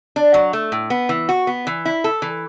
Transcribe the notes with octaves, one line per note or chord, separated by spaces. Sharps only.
D4
F#3
A3
A2
B3
E3
F#4
B3
E3
E4
A4
E3